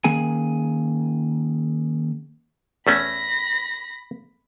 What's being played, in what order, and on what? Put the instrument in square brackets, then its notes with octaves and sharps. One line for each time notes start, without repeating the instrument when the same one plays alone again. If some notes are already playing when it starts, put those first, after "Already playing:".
[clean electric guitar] D#3 A#3 C#4 G#4 G#5
[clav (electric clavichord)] E2 A3 C#4 [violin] B5 A#6